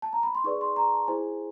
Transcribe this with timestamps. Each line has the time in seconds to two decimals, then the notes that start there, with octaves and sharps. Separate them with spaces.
0.02 A5
0.13 A#5
0.23 B5
0.35 C6
0.44 D#4 G#4 B4 D5 C#6
0.61 C6
0.76 A#5
0.93 A5
1.08 E4 G#4 C5 G#5